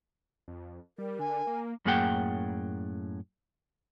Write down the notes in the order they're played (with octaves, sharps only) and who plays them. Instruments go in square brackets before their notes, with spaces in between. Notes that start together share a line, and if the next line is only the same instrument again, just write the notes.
[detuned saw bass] F2
[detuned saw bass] G3 [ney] A#4
[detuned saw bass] D3 [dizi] G#5
[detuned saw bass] A#3
[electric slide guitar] F#2 A2 A#3 G#4 F#5 G5